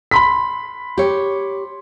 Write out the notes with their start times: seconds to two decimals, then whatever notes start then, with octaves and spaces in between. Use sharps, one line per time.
0.11 B5 C6 B6
0.98 G4 C#5